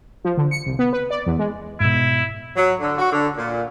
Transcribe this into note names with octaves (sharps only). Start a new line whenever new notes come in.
F3
D3
C#7
C2
B3
B4
D5
E2
G#3
G#2 B2 E4
F#3
D3
F#4
D3
A#2